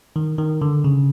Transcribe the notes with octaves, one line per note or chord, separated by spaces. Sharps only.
D#3
D#3
D3
C#3